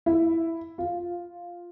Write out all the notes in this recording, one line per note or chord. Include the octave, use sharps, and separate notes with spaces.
E4
F4